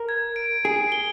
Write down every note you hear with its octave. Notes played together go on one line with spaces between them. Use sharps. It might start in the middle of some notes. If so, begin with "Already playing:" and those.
Already playing: A#4
G#6
D7
G#4 D7
G7